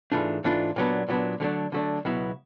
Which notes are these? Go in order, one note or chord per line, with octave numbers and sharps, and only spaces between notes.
G#2 E3 A3 D4 F4
G#2 E3 A3 D4 F4
A#2 F#3 B3 D4
A#2 F#3 B3 D4
D3 F#3 A3 D4
D3 F#3 A3 D4
C#2 B2 F#3 B3 E4